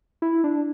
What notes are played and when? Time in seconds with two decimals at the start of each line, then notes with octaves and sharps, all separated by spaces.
0.22 E4
0.44 D4